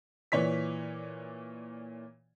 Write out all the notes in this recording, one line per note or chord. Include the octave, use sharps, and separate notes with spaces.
A#2 E3 C#5 D5 B6